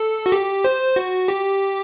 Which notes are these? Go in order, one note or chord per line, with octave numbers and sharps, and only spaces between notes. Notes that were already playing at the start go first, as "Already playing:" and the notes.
Already playing: A4
F#4
G4
C5
F#4
G4